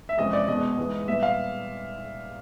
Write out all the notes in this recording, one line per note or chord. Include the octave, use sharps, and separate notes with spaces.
E5
F2 C3 E3 G#3 C#4 D#5
D5
E2 B2 G#3 D#5
G#2 E3 G#3 B3
A#2 G3 B3 E5
F5